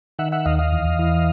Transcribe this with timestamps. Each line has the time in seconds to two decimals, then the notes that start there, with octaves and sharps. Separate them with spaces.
0.19 D#3 E5 F#5
0.32 E5 F#5
0.46 D#2 D#5 F5
0.59 D#5 F5
0.72 E2
0.99 E3